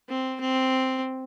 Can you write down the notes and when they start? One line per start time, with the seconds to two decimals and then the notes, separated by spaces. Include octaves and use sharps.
0.08 C4
0.41 C4